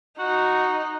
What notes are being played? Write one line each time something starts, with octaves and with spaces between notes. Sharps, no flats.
D#4 F#4